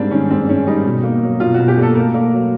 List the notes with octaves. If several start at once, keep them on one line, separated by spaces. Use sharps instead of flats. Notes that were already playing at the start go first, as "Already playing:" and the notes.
Already playing: G#2 G3 A#3 C4 D4
D#3 C#4
G#2 C4
G#2 C#4
G3 D#4
B2
A#3
F#3
B2 F4
F#4
B2
G4
A#3 A4
A2 A#4
A#3
F#3